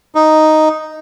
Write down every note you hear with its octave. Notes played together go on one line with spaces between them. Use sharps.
D#4